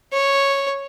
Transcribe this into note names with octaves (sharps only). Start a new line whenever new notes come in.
C#5